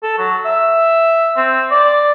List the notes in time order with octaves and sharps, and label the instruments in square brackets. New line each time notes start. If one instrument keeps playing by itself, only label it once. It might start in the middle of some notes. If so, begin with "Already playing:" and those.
[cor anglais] A4
F#3
E5
C4
D5